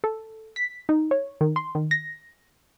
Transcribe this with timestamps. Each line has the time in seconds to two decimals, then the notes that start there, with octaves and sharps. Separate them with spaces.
0.04 A4
0.56 B6
0.89 D#4
1.11 C#5
1.41 D#3
1.56 C6
1.75 D#3
1.91 A#6